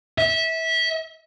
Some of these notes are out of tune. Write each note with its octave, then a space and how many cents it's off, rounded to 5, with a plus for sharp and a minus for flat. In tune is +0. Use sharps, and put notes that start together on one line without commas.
E5 -20